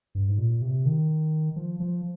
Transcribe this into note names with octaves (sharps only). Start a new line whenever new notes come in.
G2
G#2
A#2
C3
D#3
F3
F3